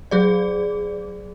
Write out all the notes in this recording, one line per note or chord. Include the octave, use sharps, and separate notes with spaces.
F#3 G#4 D5